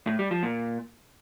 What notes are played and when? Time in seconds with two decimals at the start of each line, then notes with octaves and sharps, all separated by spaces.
0.07 A2
0.19 G3
0.31 F3
0.43 A#2